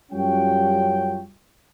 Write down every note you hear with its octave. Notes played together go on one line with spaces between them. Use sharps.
F#2 G3 C#4 F4 F#4 G5